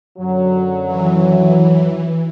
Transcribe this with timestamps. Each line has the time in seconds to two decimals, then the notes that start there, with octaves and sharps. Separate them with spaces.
0.18 F#2 D3 F#3
0.87 E3